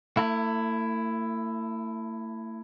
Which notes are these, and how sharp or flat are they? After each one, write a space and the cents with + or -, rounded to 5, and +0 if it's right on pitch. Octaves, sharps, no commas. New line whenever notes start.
A3 +40 E4 +10